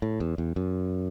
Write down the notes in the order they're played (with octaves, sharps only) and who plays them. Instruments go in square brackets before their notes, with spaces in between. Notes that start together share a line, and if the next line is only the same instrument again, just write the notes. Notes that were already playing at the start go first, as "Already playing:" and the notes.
[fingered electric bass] A2
E2
E2
F#2